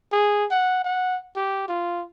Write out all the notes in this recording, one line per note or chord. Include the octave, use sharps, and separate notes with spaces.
G#4
F#5
F#5
G4
F4